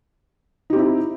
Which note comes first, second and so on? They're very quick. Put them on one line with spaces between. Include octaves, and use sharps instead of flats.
D#4 G4 C4 E4